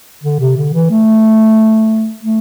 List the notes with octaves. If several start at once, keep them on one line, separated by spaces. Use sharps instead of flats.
D3
C3
D3
E3
A3
A3